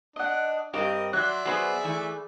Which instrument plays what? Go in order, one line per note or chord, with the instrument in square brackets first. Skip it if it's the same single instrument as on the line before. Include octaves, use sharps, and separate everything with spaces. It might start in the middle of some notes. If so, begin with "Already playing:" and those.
[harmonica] D4 [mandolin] D#5 F#5
[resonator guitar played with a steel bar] G2 C4 G4 [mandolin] A#4 [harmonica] D#5
[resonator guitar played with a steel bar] F#3 [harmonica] D5 E5 [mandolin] C6 F#6
[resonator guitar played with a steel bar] F#3 B3 C5 [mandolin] G#4 B5 C6
[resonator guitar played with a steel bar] E3 A3